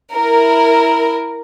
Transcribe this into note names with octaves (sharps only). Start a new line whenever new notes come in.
E4 A#4